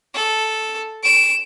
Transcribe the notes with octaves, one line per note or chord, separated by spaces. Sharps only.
A4
D7 E7